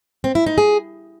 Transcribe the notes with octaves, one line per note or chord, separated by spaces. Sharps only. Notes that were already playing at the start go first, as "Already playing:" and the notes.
C4
E4
D#4
G#4